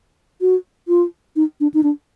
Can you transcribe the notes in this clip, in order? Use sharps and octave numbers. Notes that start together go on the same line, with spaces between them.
F#4
F4
D#4
D4
D#4
D4